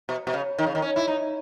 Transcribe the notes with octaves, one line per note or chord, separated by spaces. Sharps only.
B2
B2
C#3
D#3
C#3
D#3
C#4
E4
D#4